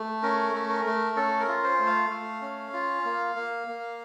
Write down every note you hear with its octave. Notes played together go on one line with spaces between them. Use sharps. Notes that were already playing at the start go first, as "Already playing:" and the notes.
Already playing: A3
C#4 A#4
A3
A#4
A3
C#4 A4
A#4
F4
C5
A3
F5
A3
C#4
F4
A#3
A#3
A#3